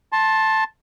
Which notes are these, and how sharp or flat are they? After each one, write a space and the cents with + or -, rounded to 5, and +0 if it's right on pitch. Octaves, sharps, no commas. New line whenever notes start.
A5 +0 C6 +25